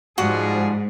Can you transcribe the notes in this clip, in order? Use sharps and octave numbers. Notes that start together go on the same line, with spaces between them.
G#2 F3 G3 F#4 G#4 F#5